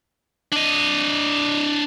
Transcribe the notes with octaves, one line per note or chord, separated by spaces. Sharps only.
D4 D#5